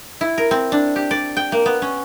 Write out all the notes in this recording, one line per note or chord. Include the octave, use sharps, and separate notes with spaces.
E4
A#4
C4
D4
G4
D5
G5
A#3
B3
C#4